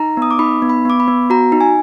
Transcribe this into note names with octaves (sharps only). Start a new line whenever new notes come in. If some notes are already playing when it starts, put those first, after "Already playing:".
Already playing: D#4 A#5
B3 D#6
D6
D#4 B5
B3
B5
B3 D6
B5
B3
F#4 A#5
D#4
G#5